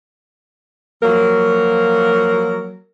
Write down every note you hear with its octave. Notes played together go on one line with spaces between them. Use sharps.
F3 F#3 A#3 A#4